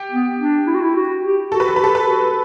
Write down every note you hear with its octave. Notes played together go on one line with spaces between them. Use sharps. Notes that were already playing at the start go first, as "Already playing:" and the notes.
Already playing: G4
B3
D4
E4
F#4
E4
F#4
G4
F#4 A4
B4
A4
B4
G4 A4
B4
F#4